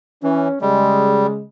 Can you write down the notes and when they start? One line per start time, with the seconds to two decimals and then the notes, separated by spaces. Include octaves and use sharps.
0.23 E3 C#4
0.61 C#3 G3 G#3